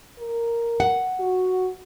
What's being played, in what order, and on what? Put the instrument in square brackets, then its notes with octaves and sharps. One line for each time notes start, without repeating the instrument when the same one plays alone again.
[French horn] A#4
[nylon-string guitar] F#5
[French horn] F#4